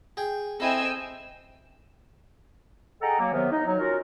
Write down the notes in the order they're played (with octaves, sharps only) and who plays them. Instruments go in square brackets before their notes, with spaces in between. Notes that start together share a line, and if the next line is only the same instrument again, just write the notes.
[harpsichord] G#4 G5
[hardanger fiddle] C4 D#5 [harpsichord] E4 A4 [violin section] G5 G#5 E6
[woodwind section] G#4 A4 D#5 F#5 G5 A#5
F#3 A#3
C3 D#3 F#3 B3
D#4
F#3
C#4 F4 F#4 A#4